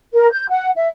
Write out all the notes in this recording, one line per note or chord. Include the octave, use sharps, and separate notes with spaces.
A#4
G6
F#5
E5